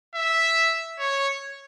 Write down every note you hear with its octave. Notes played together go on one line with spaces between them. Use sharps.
E5
C#5